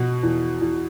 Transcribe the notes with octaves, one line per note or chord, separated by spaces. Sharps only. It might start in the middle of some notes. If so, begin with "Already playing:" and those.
Already playing: B2 F#4
E2
E2